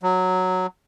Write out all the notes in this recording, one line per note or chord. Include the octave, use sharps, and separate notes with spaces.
F#3